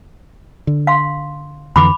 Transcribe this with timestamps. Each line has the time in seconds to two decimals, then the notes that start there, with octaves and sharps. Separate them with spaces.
0.67 D3
0.87 F5 C6
1.76 F2 D3 E3 B5 D6